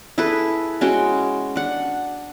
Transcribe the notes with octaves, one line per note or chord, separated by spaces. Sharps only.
E4 G#4 A4 B4
G#3 C#4 F#4 G5
D4 F#5